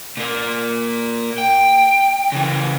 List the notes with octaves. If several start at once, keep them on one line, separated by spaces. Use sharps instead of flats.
A#2 A#3
G5
C#3 E3